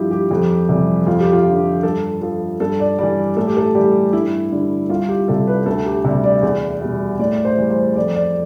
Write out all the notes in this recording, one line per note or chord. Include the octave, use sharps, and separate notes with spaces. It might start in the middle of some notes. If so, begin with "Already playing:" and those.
Already playing: G2 F3 E4 G4
G4
F2
C3 E3 G3
F2 F4
G4
F4
D3 F3
G2 A4
F3 A4
G2 A4
D5
E3 G3 D5
A2 A4
G4
A4
E3 G3 G4
G2 E4
D3 G3
C2 F4
G4
C3 G3 A4
B4
D2 A4
G4
C3 G3
D5
E2 D5
B2 G3
A2 D5
C5
E3 G3
C5
F2 D5
D5